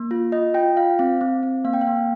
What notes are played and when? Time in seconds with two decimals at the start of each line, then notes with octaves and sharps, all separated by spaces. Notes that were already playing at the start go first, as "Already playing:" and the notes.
Already playing: A#3
0.11 F4
0.32 F4 D#5
0.54 F4 G5
0.77 F4 F5
0.99 C4 F5
1.21 C4
1.43 C4
1.65 A#3 F5
1.73 G5
1.81 F5
1.87 A#3